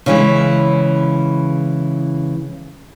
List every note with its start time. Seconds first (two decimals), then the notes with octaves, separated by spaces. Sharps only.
0.06 C#3 E3 G#3